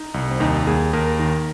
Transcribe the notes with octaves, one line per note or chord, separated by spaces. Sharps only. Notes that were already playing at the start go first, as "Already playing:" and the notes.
Already playing: D#4
C2
C4
D#2 D#4
D#2 G#4
D#2 A#4
D#3